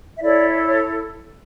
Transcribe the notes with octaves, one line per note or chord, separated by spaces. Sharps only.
E5
E4 A4 C#5 D5
C#5